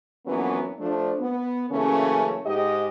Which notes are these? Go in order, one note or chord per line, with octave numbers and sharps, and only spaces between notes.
F2 E3 F#3 A#3 B3 C#4
F3 A3 D4
B3
C#3 E3 F#3 A3 A#3 C#4
G#2 G4 D#5